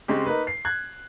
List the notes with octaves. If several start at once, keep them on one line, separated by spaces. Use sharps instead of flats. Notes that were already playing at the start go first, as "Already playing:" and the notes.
C#3 G#3 C4 G4
A#3 D#4 B4
C7
F#6 G#6